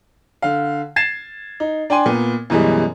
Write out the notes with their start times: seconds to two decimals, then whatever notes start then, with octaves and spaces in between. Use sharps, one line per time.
0.42 D3 F5
0.96 G#6 A6 C7 E7
1.60 D#4
1.90 D4 G5 G#5 C6
2.06 A#2 B3
2.50 F#2 B2 E3 G3 G#3